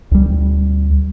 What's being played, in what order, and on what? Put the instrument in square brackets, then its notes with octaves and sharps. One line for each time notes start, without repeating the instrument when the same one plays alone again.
[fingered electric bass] D2 G3